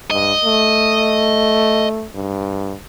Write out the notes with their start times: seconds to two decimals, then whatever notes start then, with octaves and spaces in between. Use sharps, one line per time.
0.11 G2 D#5
0.44 A3
2.15 G2